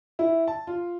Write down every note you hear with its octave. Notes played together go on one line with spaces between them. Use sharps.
E4
A5
F4